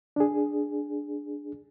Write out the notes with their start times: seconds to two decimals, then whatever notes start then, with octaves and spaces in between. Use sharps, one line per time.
0.16 D4 G#4